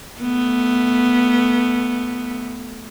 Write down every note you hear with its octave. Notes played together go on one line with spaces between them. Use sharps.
A3 B3